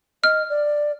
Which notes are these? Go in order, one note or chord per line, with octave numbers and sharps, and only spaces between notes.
D#5 F6
D5